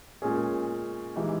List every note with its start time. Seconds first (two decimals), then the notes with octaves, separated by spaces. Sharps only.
0.22 A#2 G#3 C#4 G#4
1.15 E3 G#3 D#4 G4